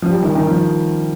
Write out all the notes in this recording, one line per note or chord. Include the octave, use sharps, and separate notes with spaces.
F3
G3
D#3
D#3
F3